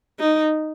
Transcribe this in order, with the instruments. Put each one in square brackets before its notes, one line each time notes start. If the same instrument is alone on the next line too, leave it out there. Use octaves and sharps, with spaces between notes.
[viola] D#4